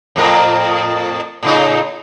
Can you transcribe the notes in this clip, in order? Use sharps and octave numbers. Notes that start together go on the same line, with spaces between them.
F2 A2 A#4
A2 C#3 D#4